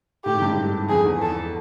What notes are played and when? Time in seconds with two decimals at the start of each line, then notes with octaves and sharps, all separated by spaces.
0.25 A2 G4
0.34 G#2
0.42 G2
0.50 G#2
0.89 F2 G#4
1.05 E2
1.21 A4